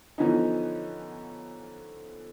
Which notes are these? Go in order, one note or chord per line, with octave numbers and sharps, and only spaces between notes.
D3 E3 F3 B3 C#4 D#4